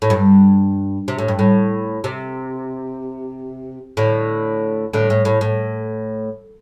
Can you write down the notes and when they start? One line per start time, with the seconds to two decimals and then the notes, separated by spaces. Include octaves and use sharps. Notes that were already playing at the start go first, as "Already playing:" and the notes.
0.02 A2
0.10 G2
1.08 C3
1.18 A2
1.28 G2
1.39 A2
2.04 C3
3.97 A2 D3
4.93 A2 D3
5.10 A2
5.25 A2
5.41 A2